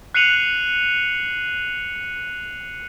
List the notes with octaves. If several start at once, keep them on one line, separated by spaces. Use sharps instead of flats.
F#6 C7 C#7 D#7 F7 F#7